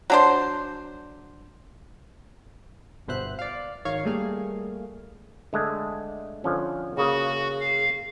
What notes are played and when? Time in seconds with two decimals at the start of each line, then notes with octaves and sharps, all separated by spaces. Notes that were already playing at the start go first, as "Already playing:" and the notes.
0.10 F#3 D4 C5
3.08 G1 B2 B3 C5 E5 F#6
3.39 D5 F5
3.85 G#1 D#3 C#5 F5 C#6
4.05 G3 A3 A#3 G#4 F5
5.53 D3 G#3 A3
6.44 D3 F3 C#4
6.97 C#3 A#3 F#4 G#4
7.60 F5